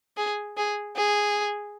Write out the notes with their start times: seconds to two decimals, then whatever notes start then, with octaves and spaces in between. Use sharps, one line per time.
0.17 G#4
0.57 G#4
0.96 G#4